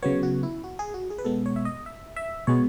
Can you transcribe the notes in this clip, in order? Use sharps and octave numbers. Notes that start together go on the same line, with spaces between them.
C#3 F#3 B3 C#5
F#4
E4
F#4
G#4
F#4
G#4
B4
B2 G#3 B3 A4
C#5
E5
D#5
E5
E5
B2 G#3 B3 C#5